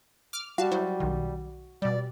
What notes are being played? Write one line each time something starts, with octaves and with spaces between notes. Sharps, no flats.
D6 F6
G3 F#4 F5 A5
F#3 E4 C5
B1 D#3
B2 G3 D5